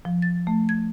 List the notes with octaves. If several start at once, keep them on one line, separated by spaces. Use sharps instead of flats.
F3
A6
A3
G#6